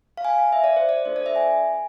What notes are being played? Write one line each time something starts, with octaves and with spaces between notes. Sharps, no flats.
F5
G#5
F5
E5
D5
C5
D5
A3 D4 F4 A4 C5
D5
E5
G#5